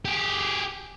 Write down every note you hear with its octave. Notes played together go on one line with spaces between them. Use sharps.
G4 G#4